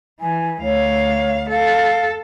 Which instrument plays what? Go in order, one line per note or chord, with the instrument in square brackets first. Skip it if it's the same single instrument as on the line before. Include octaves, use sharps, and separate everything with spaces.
[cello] E3 [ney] G#5
[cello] D2 F5 [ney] C#5
[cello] A4 [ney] F5